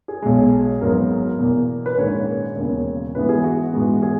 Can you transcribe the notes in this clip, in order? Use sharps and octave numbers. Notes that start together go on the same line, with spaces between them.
G#4
B1 B2 G#3
G#1 G#2 F#3 B3 A#4
E2 B2 A#3
B4
A#1 G#2 D#3 A#3 C#4 C#5
E1 D#2 C#3 C#5
G#2 E3 B3 B4
G#4
F#4
G#2 E3 G#3 B3
G#4